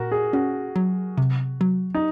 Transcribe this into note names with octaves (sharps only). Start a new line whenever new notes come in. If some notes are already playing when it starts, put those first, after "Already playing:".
Already playing: A#2 F#4 A#4
G#4
C#4 F#4
F#3
C3
F#3
D#4